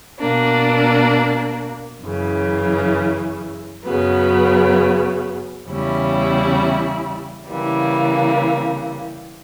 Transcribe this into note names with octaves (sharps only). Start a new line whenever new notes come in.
B2 A#3 D4
F#2 C#3 E3
F#2 C#3 F#3 B3
E2 C#3 G3 C#4 E4
C#3 E3 G3 A#3